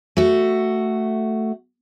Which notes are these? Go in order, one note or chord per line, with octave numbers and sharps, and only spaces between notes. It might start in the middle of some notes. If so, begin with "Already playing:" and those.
A3 F#4